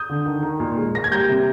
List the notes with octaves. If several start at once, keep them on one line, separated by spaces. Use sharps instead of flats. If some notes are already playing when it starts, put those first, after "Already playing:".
Already playing: D#6 G6
D3
D#3
D#3
A#2
G#3
A#3 A#6
G#6
G3 G6 A#6
C3